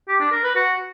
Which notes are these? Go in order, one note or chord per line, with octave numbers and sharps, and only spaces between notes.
G4
D4
A#4
B4
F#4